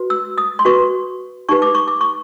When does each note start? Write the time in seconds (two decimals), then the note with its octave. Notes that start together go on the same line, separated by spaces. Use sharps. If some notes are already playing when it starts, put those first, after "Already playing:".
Already playing: F#4 B4
0.10 E6
0.38 D#6
0.59 C6
0.65 F#4 B4 C#6
1.49 D#4 G4 B4 C#6
1.62 D6
1.75 C#6
1.88 D6
2.01 C#6